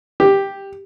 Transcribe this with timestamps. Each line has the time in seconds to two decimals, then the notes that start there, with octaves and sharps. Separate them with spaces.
0.20 G4